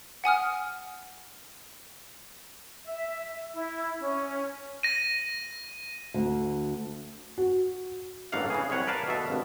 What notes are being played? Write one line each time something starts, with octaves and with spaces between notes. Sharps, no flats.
F#5 G#5 D#6 F6
E5
E4
C#4
A#6 D#7
D2
F#4
A1 G2 A3 A#3 F5 F#5
C#3 E3 G#4
C2 B4 C#5 F#5
A#4 B4 D5 F5 A5
D#2 B2 A4 E5
G#1 G2 B2